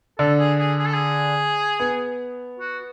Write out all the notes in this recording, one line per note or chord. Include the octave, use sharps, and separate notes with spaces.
D3 A4
G#4
G#4
G#4
A4
G#4
B3
F#4